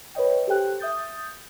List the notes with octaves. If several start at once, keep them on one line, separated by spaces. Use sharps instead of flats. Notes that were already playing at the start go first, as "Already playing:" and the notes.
B4 C#5 D#5 G5
G4 A4 C5 G5 F#6
E5 D#6 G6 A6